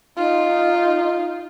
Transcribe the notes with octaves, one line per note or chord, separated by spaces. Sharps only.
D#4 F4